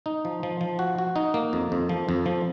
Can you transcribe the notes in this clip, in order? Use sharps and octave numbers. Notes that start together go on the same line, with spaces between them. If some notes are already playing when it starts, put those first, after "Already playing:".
D#4
F3
F3
F3
F#4
F#4
D#4
A#3
F2
F2
F3
F2
F3